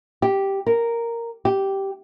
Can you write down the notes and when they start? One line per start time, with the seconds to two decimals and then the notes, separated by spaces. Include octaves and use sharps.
0.22 G4
0.66 A#4
1.45 G4